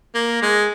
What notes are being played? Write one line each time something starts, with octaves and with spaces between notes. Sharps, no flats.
A#3
G#3